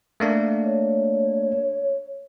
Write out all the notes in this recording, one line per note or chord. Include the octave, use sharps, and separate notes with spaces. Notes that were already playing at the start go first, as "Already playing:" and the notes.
A3 A#3 D4
C#5